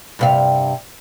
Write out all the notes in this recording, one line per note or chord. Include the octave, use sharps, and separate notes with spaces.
G2 C3 F5